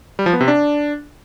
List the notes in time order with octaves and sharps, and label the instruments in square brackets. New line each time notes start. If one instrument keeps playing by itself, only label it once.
[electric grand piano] G3
F3
B3
C3
D4